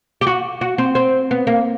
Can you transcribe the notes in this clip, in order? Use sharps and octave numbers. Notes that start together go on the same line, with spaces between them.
G4
F#4
F#4
C4
C4
B3
A#3